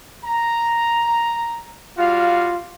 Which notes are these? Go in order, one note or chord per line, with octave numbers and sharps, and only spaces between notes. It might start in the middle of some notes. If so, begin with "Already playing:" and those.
A#5
G3 F4 F#4 F5